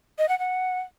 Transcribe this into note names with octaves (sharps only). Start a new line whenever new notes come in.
D#5
F#5
F#5